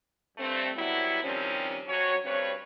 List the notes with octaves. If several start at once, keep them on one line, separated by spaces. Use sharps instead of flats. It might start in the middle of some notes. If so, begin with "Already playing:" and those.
G2 A3 C4
A2 F#3 G3 B3 E4
C3 D#3 F3 G3 C4 C#4
F2 F#3 C#4 F#4 C#5
D2 G2 C4 B4 C#5